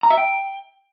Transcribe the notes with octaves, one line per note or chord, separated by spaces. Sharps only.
A#5
E5
G5